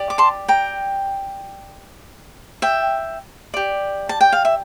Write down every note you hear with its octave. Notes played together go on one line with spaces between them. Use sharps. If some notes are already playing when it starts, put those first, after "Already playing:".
Already playing: G4 D5
D6
A5 C6
G5 A#5
E5 G5
G4 D5
A5
G5
F5
E5